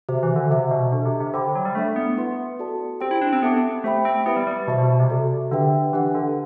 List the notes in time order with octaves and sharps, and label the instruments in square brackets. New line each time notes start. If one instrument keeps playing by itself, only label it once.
[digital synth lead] C3 [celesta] F#4 C5 E5
[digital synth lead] E3
D3
[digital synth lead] C3 [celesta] F#4 C5 E5
[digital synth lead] B2
[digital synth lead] B2 [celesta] D4 A4 E5
[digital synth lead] C3
C3
[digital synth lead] D3 [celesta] C5 G5 B5 D6
[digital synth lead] F#3
G3
[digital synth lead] A3 [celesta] D4 A4 E5
[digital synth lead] B3
[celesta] E4 B4 F#5 C6
F#4 A4 D5 A5
[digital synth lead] C4 [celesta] G4 C5 G5 C6
[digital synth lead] E4
D4
C4
[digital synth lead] B3 [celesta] A4 E5 A5 D6
[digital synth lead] A3 [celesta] G4 C5 E5 G5 B5
[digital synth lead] C4
[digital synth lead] B3 [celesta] E4 G4 B4 E5 B5
[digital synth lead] G3
G3
[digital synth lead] B2 [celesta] C5 E5 A5
[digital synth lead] B2
B2
C3
[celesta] F#4 A4 D5
[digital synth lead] D3 [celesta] D4 G4 B4 E5 G5
[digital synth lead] E3 [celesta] D4 G4 B4 F#5
[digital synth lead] D3